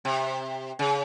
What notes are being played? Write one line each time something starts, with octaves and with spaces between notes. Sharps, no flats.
C3
C#3